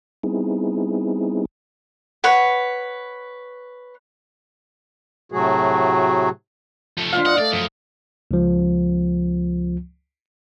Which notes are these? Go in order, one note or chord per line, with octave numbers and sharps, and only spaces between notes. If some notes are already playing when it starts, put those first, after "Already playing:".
G3 B3 C4 D#4 E4 G#4
B4 C#5 F#5
A2 C3 F#3 A3 F#4 G#4
F3 A3
F2 D4 F4 F5
D#5 F#5
A3 D5
F#2 F3
C#2 F3